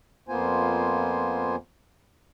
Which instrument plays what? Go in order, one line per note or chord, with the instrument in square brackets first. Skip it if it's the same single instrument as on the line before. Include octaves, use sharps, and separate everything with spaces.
[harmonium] F2 A#3 B3 F4 C5 G#5